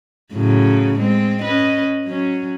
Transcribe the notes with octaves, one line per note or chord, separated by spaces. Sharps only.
A2 C#3 F#3
G#3 C4
C#4 B4 D#5
F#3 C#4